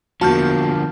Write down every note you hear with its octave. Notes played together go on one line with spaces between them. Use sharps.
E2 D3 F3 A#3 F#4 A5 F6 G6